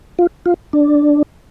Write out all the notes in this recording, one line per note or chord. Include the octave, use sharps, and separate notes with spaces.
F4
F4
D4